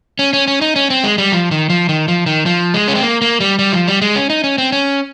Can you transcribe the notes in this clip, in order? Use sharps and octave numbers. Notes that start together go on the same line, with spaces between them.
C#4
C#4
C#4
D#4
C#4
C4
G#3
G3
F3
D#3
F3
D#3
F3
D#3
F3
G#3
C#4
C4
A#3
A#3
G3
G3
F3
G3
G#3
C#4
D#4
C#4
C4
C#4